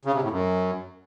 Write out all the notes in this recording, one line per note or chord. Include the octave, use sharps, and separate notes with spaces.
C#3
C3
A2
F#2